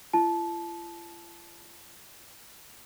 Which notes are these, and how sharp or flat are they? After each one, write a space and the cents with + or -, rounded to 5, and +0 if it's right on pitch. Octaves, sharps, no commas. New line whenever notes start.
F4 -45 A5 -20